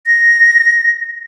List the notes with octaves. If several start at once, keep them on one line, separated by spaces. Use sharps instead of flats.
A#6